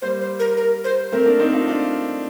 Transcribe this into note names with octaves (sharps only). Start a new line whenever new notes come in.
G3 A#3 C5
C5
A#4
A#4
C5
A3 C4 A#4
A#3 D4
C4 D#4
D4 F4
D4 F4